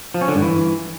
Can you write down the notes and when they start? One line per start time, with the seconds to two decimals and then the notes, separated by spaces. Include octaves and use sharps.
0.14 F3
0.21 C#4
0.28 D3
0.35 G2
0.42 E3